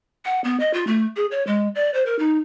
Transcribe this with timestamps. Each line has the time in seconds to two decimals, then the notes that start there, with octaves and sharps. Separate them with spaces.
0.25 F#5
0.44 B3
0.60 D#5
0.73 F4
0.87 A3
1.16 G#4
1.31 C#5
1.47 G#3
1.75 D5
1.94 C5
2.06 A#4
2.19 D#4